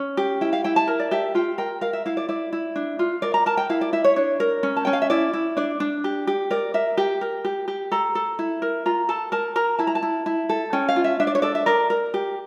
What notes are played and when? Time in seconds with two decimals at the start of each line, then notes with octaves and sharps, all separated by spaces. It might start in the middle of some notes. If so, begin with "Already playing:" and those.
Already playing: C#4
0.17 G4
0.41 E4 G5
0.53 F5
0.64 E4 G5
0.76 A5
0.88 A#4
1.00 D5
1.11 G4 E5
1.35 F4 G5
1.58 A#4 G5
1.81 A#4 F5
1.93 E5
2.06 E4 F5
2.17 D5
2.29 E4 D5
2.53 E4
2.76 D4
2.99 F4
3.22 A#4 D5
3.34 A#5
3.46 A#4 A5
3.57 G5
3.70 E4 F5
3.81 D5
3.93 E4 E5
4.04 C#5
4.16 D4 C#5
4.40 A#4
4.63 C#4
4.76 A5
4.85 C#4 G5
4.93 F5
5.02 E5
5.10 E4 D5
5.33 E4
5.57 D4 D5
5.80 D4
6.04 G4
6.27 G4
6.51 A#4 D5
6.74 A#4 E5
6.97 G4 G5
7.21 A#4
7.45 G4
7.68 G4
7.92 A4 A#5
8.15 A4
8.39 E4
8.62 A#4
8.86 F4 A#5
9.09 A4 A5
9.32 A#4 A5
9.56 A#4 A#5
9.79 E4 A5
9.87 A#5
9.95 A5
10.03 E4
10.26 E4
10.49 A4
10.73 C#4 G5
10.89 F5
10.96 F4
11.04 E5
11.20 D4 E5
11.27 D5
11.35 C#5
11.42 A4 D5
11.55 E5
11.66 A#4 D5
11.90 A#4
12.14 G4